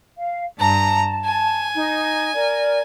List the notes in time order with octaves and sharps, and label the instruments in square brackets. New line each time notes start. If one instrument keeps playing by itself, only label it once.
[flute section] F5
[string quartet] G2 A#5 [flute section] A5
[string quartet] G#5
[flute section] D#4
A#4 D5